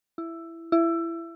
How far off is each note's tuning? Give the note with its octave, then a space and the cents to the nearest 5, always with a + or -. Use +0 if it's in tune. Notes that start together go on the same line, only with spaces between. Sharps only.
E4 +10
E4 +20